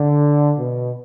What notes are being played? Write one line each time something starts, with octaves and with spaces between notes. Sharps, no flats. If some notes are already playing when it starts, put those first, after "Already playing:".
Already playing: D3
B2